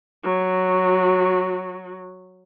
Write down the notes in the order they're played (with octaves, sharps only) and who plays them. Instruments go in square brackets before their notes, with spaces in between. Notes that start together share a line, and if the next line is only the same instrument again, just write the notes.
[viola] F#3 F#4